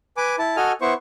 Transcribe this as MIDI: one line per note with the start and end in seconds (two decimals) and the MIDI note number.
0.17 0.36 71
0.17 0.36 80
0.17 0.36 86
0.39 0.56 64
0.39 0.56 81
0.56 0.72 66
0.56 0.72 69
0.56 0.72 75
0.56 0.72 80
0.56 0.72 89
0.81 0.94 59
0.81 0.94 64
0.81 0.94 72
0.81 0.94 85